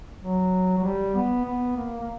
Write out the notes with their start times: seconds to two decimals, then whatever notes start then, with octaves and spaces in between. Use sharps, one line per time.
0.22 F#3
0.78 F#3
0.84 G3
1.15 B3
1.45 B3
1.77 A#3
2.01 A#3